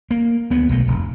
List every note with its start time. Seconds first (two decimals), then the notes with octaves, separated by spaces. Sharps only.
0.11 A#3
0.50 D2 B3
0.69 B1 B2 A3
0.88 F1